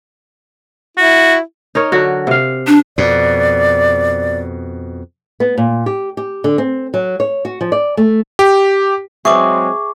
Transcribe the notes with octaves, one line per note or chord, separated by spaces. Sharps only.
E4 F#4
D#4 A#4 C#5
D3 F#3 F#4
C3 F5
D4
F2 B2 D5
B3
A#2
G4
G4
D3
C4
F#3
C#5
F#4
F3
D5
A3
G4
F#3 G#3 C4 G#4 B4 E5 C#6 D6